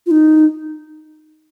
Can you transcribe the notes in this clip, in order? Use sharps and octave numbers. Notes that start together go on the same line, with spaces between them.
F4
D#4